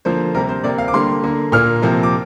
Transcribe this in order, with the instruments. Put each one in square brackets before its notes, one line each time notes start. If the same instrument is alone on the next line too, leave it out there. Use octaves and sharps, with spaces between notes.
[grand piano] D3 F3 A#3 C5
C3 G3 A#3 A#4
C5
C3 A#3 D5
F5
D6
D3 G3 A#3 C6
D3 A#3
A#2 A#3 F6
C3 F3 A#3
D6